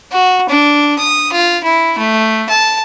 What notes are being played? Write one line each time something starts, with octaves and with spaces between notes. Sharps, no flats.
F#4
D4
D#6
F4
E4
A3
A5